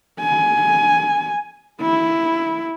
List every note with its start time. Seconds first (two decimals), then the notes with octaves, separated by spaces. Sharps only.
0.20 G#5
1.81 E4